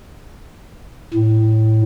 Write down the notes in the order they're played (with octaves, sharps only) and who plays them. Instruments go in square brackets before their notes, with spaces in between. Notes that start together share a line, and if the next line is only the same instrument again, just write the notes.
[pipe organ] A2